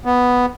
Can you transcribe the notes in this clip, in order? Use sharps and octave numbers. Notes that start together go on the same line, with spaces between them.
B3